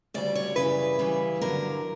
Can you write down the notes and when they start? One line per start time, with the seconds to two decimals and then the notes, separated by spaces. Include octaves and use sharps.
0.14 D2 C#3 G3 D5
0.35 C#5
0.56 F#2 C#3 E3 G3 B4
0.99 F#2 C#3 E3 G3
1.41 G2 D3 F#3 A#4